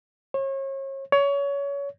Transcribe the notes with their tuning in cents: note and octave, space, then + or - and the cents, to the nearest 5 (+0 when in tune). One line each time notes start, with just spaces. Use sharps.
C#5 -35
C#5 +25